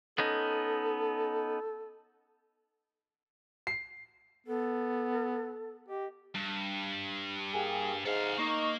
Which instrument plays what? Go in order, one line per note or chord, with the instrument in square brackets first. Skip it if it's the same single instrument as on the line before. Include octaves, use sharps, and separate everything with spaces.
[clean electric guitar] B3 C#4 D#4 [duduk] A4
[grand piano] C7
[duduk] B3 [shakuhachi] A4
[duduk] G4 [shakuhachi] D#5
[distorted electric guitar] G2
[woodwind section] A#3 G4 G#4
[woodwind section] G#2 [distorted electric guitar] A4 F5
[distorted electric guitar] A#3 [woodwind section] D#4 C#6